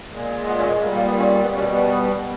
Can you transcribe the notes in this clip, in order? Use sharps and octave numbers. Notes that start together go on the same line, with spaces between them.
A#2 G#3
B3
C#4
A#2 G3 A#3
A#3
B3
C#4
A#3
B3
B2 G3 C#4
B3